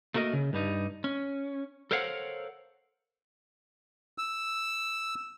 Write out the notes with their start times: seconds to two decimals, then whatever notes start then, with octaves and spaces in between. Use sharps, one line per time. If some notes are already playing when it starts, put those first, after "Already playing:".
0.14 A3 A#3 F#4 A#4 D#5
0.33 C#3
0.53 G2 G3 D#4
1.04 C#4
1.91 A4 A#4 C5 C#5 F5 F#5
4.18 E6